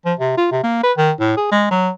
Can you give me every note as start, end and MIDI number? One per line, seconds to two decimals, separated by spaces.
0.05 0.14 53
0.20 0.36 48
0.37 0.47 65
0.52 0.60 48
0.63 0.81 58
0.83 0.92 71
0.98 1.11 51
1.20 1.35 45
1.37 1.51 68
1.51 1.68 56
1.71 1.89 54